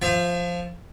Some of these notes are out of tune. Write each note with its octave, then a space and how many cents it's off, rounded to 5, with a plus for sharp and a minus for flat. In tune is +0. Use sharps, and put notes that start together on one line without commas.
F3 +0 E5 +35